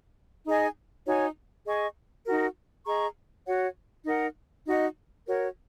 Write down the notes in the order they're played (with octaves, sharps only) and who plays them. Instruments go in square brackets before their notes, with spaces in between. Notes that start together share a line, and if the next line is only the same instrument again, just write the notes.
[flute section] D#4 G#4 D#5 G#5
D#4 F#4 C#5 G#5
G#4 D#5 G#5 C#6
D#4 F#4 A#4
G#4 D#5 A#5 C#6
F#4 C#5 F#5
D#4 A#4 F#5
D#4 F#4 D#5
F#4 A#4 C#5